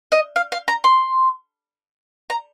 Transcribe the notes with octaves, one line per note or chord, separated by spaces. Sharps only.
D#5
F5
F5
A#5
C6
A#5